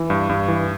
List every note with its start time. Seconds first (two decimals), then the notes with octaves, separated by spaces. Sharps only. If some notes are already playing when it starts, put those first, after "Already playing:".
Already playing: E3
0.10 G2
0.29 G2
0.48 E3